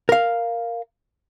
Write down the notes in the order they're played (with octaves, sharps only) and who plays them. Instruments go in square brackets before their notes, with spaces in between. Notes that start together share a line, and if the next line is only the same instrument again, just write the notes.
[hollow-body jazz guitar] A#4 F5